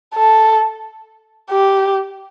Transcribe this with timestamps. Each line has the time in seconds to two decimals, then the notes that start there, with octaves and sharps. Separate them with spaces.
0.15 A4
1.51 G4